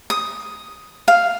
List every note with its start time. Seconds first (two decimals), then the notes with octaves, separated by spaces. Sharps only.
0.10 D#6
1.08 F5